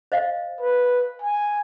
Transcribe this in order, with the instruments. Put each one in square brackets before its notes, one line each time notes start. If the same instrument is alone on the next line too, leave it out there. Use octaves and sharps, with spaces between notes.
[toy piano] C5 D#5 F5
[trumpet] B4
G#5